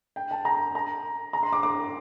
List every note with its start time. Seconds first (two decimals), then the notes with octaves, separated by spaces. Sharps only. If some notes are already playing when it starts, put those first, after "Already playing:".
0.16 G5
0.31 A5
0.45 A#5
0.75 A#5
1.33 A#5
1.43 C6
1.53 D6
1.63 D6